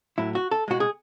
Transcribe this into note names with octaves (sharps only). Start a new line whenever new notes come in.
A2 F#3 E4
F#4
A4
B2 G#3 F#4
G#4